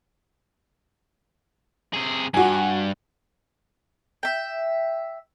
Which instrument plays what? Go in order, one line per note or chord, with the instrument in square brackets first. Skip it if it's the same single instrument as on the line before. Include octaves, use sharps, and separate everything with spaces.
[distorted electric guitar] C3 G#4
[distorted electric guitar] G2 [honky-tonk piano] F#4 G#5
[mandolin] E5 G5